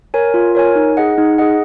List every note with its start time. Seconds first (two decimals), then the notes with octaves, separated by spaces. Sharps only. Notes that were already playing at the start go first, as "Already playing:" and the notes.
0.14 A#4 C#5 G#5
0.34 F4
0.55 A#4 C#5 G#5
0.76 D#4
0.97 G#4 D#5 F#5
1.18 D#4
1.38 G#4 D#5 F#5